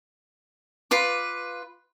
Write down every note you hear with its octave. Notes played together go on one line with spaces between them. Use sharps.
F4 B4 D6